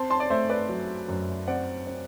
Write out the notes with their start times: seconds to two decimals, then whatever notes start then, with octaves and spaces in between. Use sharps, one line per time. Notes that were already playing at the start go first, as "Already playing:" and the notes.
Already playing: C4 A5 C6
0.10 A5 C6
0.20 D5
0.30 A3 C5 E5
0.49 B4 D5
0.69 F#3
1.09 F#2
1.47 C4 D5 F#5
1.87 C4